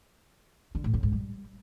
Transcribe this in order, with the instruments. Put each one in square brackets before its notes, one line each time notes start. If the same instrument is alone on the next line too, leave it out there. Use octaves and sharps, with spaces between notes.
[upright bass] D3
A2
C#3
G#2
G3